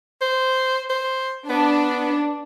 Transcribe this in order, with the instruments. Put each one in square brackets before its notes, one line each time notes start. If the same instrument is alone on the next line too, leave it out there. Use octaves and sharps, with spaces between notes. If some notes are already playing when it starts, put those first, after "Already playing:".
[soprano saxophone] C5
C5
[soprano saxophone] B3 [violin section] D4